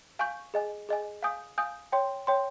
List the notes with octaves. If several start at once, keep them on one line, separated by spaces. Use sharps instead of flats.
F5 G#5 C#6 G6
G#4 D#5 G#5
G#4 D#5 G#5
F5 G#5 D#6 G6
F5 G#5 D#6 G6
C#5 G5 C6
C#5 G5 C6